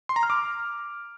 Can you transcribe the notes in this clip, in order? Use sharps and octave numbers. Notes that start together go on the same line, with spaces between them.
C6
A#5
F6
D6